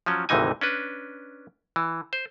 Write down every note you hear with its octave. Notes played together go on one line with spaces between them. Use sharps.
F3 F#3 C#4
G#1 D2 C3 E3 D#4 G#5
C#4 D4 B4
E3
C5